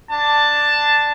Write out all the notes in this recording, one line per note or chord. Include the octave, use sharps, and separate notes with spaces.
D4 A5